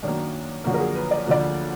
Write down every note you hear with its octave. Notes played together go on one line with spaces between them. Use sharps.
F#2 D#3 F#3 A#3 D4
F#2 D3 F3 A#3 F#4
A#4
G#4
B4
D5
D2 D3 F3 A#3 D5